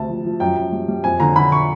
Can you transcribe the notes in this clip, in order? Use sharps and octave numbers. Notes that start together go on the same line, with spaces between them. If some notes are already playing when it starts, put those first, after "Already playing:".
Already playing: D2 C3 A5
F3
F3
F#2 G5
F#2
G3
G3
F2 G#5
D3 A#5
D3 B5
C#6